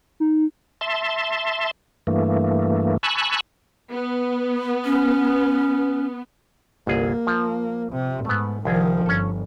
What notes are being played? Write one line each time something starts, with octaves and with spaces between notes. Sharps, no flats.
D#4
E5 A5 C6
G2 E3 A3 A#3
G#5 A5 B5 C#6 E6 F#6
B3
C#4
G1 C2 A#3 G#4
F3
C3
G#2 A3 B3
C2 D#3 F3 G#4
G1 C#4 A4